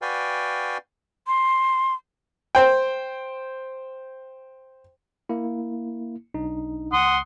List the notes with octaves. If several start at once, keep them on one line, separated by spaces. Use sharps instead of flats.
F#4 B4 D5 F5 G5 G#5
C6
C5 G5
A#3 E4
B1 D4 D#4
C#2 F#5 C6 D#6